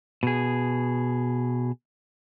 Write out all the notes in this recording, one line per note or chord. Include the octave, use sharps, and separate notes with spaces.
B2 G#4